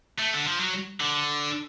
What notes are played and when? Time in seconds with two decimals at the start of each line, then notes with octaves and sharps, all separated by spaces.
0.18 A3
0.34 D3
0.47 F3
0.60 F#3
1.00 D3